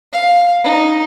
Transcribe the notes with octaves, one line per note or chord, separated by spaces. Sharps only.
F5
D#4